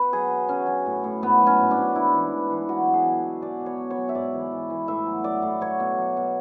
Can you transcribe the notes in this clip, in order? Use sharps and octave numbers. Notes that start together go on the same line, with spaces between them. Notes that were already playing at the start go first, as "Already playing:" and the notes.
Already playing: B2 B4
F#3 G#4
B2
F#3 C#4
F#3
A2
A2
G#2 B3
F#3
C#4
G#2
D4
G#2
E3 E4
E3
E3
E3
F#3 F#4
B2
G#4
F#3
B2
B2 D5
B2
C#5
F#3
C#5
F#3
E5
G#2 D5
E3
E3
E3
A2 E5
F#3
F#3 D5
A2
F#3 C#5
B2
F#3
B2